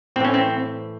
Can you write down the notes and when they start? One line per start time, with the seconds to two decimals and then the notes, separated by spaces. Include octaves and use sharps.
0.16 A2 C4
0.20 E3 C#4
0.34 C4